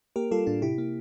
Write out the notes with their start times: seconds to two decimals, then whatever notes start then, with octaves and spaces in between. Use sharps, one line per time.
0.16 A#3 G4 A#4
0.31 G3 F4 A4
0.46 A2 D4 F4
0.62 C3 E4 G4
0.78 A#3